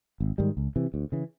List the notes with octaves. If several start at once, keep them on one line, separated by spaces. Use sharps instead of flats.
G#1
G#2 D#3 G3
C#2
C3 E3
D2
C#3 E3